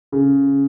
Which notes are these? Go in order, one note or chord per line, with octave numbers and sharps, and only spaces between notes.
C#3